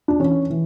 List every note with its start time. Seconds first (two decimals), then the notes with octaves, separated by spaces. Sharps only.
0.08 D4
0.19 E3 C#4
0.50 E3